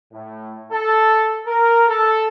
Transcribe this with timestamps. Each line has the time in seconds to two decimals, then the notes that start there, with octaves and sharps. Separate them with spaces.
0.13 A2
0.72 A4
1.47 A#4
1.88 A4